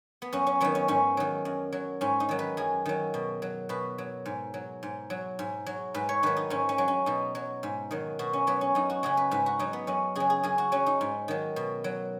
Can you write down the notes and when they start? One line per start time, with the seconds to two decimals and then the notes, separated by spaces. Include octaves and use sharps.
0.22 B3
0.33 F#2 C#4
0.47 C#4
0.61 D#3 F#3 B3
0.75 C#4
0.88 G#2 C#4
1.17 D#3 F#3
1.45 F#2
1.72 F#3
2.01 G#2 C#4
2.20 D#4
2.29 D#3 F#3
2.39 B4
2.57 F#2 G#4
2.86 D#3 F#3
3.14 B2
3.42 F#3
3.69 B2 B4
3.98 F#3
4.26 G#2
4.54 F#3
4.83 G#2
5.10 F#3
5.39 G#2
5.66 F#3
5.94 G#2 B4
6.09 C#5
6.23 D#3 F#3 B4
6.37 D#4
6.50 G#2 C#4
6.69 C#4
6.78 F#3
6.88 C#4
7.06 B2 D#4
7.35 F#3
7.63 G#2
7.91 D#3 F#3
8.19 B2 F#4
8.33 C#4
8.47 F#3 B3
8.61 C#4
8.75 F#2 D#4
8.90 F#4
9.03 C#3 F#3 G#4
9.17 B4
9.31 G#2 B4
9.46 F#4
9.59 F#3 D#4
9.73 B3
9.87 F#2 C#4
10.15 C#3 F#3 G#4
10.30 G#4
10.43 F#2 G#4
10.58 F#4
10.72 F#3 C#4
10.86 D#4
11.01 G#2
11.28 D#3 F#3
11.56 B2
11.84 F#3